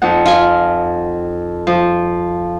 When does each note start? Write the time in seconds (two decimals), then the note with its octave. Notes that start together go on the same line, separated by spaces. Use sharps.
0.02 F2 D#4 F#5
0.26 F4 D#5 G#5
1.67 F3